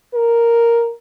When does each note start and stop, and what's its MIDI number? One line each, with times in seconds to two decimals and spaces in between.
0.14 0.92 70